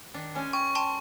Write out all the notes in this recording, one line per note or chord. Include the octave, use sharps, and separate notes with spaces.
D#3 D4
G#3 C#4 G#5
G5 C#6
G5 A5 C6